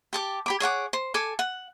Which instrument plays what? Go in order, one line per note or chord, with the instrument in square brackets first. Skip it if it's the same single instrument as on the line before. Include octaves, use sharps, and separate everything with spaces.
[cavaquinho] G4 A5 D6
G4 B5 D6
G#4 C#5 F#5 D6
C5
A4 G#5 D6
F#5